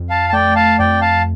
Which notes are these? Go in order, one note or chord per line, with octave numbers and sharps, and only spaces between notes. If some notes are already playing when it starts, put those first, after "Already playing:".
Already playing: F2
F5 A5
A5
A3 D5 G5
F5 A5
F2 D5 G5
F5 A5